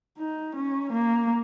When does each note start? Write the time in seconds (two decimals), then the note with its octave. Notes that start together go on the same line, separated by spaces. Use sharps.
0.18 D#4
0.56 C#4
0.93 A#3